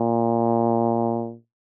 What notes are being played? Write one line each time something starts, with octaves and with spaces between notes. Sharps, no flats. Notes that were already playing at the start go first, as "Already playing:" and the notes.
Already playing: A#2